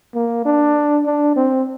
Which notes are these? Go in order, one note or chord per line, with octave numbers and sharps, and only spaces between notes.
A#3
D4
D4
C4